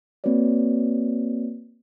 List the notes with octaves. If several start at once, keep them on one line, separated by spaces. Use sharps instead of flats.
A#3 C4 F#4 B4 C#5 D5